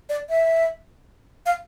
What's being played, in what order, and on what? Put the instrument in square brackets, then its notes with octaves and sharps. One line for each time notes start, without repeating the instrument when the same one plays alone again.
[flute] D5
E5
F5